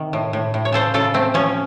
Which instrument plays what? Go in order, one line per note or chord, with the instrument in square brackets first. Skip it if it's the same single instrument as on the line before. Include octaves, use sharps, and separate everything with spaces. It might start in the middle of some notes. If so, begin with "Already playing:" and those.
Already playing: [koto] C3 D#3
A2
A2
A2
C#5
C#3 A4 C5
C#3 F4 A4
A3 C4
F3 C#4